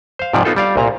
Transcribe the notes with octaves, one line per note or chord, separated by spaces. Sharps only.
C5 F5
G#2 C3 F3 D5
B3 D#4 F4 A4 C5
G3 D5 F5
C2 A#2 A#5